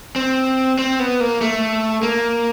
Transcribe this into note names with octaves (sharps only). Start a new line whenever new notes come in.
C4
C4
B3
A#3
A3
A#3